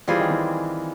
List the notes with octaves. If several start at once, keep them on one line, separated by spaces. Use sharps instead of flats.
E3 G3 C4 F4 G#4
D#3
E3